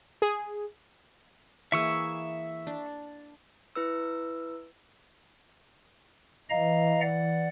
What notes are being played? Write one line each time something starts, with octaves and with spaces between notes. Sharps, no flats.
G#4
E3 A#3 G#4 E5 C#6 E6
D4
E4 B4 E6
E3 D#5 F5 A#5
D5 F#5